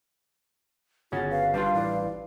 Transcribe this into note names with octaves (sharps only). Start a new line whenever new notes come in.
G1 C#3 C#4 F4 F#4 A6
B4 F5
G3 D4 F4 B4
A1 E4 B4 D5